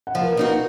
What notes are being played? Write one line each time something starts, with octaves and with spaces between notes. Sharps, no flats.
F#5
F3 F5
A#4
B4
A#3 D#4 F#4 A#4